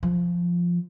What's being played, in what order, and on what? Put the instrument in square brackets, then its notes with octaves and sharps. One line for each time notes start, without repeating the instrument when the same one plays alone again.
[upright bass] F3